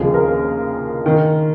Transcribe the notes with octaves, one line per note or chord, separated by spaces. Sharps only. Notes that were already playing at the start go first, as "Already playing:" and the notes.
Already playing: D#2 C#3 F3 G#3 G#4
A#4
D#3